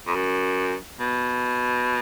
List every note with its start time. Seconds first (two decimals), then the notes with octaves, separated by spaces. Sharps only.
0.07 F2
0.15 F#2
1.00 B2